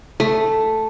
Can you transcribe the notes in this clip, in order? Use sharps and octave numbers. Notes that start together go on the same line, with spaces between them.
A3